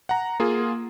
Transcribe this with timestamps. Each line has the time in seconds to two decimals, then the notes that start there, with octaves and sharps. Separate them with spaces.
0.09 F#5 A#5
0.40 A#3 F4 G#4